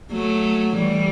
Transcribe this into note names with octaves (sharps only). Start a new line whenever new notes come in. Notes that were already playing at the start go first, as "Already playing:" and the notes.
F#3 A3
E3 G3